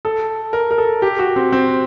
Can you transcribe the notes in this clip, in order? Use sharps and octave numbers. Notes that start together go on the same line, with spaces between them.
A4
A#4
A#4
A4
G4
F#4
C4
C4